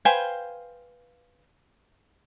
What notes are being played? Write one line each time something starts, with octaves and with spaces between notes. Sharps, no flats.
B4 C5 F5 G5 G#5